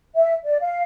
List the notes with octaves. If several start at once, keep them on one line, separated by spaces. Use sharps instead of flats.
E5
D5
F5